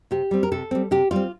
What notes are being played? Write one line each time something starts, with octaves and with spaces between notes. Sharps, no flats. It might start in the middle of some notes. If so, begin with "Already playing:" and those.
C3 G4
G3 C4
A#4
C3 A4
G3 C4
C3 G4
G3 C4 F4